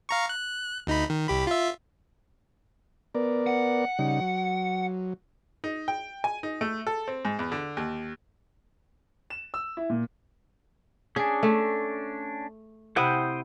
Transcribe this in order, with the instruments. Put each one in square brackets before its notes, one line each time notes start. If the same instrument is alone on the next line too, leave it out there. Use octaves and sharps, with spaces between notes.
[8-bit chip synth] F5 A#5 C#6
F#6
D2 D#4 B5
D#3
C2 G4 B5
F4 E5
[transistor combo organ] B3 A#4 D5
[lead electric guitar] F#5
[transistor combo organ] C#3 G3 D#4
F#3
[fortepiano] D#4
G5
G#5
D#4
A3
A4
C4
G#2
E2
D3
D#2
[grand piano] E7
E6
E4
A#2
[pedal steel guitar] C#4 D4 [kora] G#4
[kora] A3
[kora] C3 E4 F#5 [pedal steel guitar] C5 G5 D#6